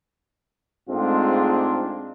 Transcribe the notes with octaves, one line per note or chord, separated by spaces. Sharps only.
G#2 G#3 A3 C4 D4 F4